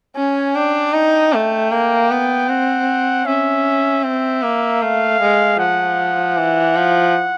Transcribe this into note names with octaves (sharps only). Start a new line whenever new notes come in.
C#4 G#5
D4 G5
D#4
A3
A#3
B3
C4 F#5
C#4 E5
C4 E5
A#3
A3 F5
G#3
F3 F#5
E3
F3